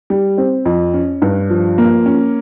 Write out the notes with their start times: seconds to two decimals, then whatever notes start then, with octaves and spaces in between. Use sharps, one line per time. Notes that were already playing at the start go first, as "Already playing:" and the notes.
0.10 G3
0.38 C4
0.66 F2
0.94 C#4
1.22 G2
1.50 F3
1.78 A#3
2.06 C#4